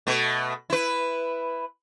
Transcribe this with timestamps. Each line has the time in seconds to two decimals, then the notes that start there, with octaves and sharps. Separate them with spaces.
0.07 B2 A3
0.70 E4 B4